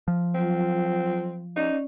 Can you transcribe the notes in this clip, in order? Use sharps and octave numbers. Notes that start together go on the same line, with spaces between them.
F3
F#3 C4 F4
C#4 D#4 D5